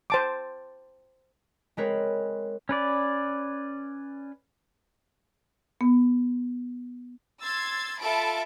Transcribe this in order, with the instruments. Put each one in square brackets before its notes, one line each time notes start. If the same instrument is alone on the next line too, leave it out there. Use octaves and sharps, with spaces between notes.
[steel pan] C5 A5 D6
[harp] G#3 C4 A#4 B4 C#5
[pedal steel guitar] C#4 B4 D5
[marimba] B3
[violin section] C6 E6 G#6 A6
F4 A4 E5 A5 B5 D7